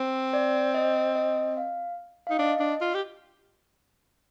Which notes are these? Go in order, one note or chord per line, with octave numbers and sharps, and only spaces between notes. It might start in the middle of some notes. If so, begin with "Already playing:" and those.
Already playing: C4
D5
D#5
D#5
F5
D#4 F5
D4 D#5
D4
F4
G4